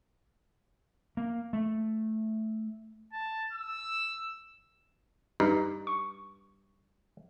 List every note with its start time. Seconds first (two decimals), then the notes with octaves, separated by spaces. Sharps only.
1.17 A#3
1.53 A3
3.13 A5
3.53 E6
5.40 G2 D#4
5.87 C#6